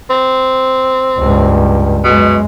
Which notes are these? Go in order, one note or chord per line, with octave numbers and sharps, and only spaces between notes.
C4
C#2 G2
F#2 B2 G#3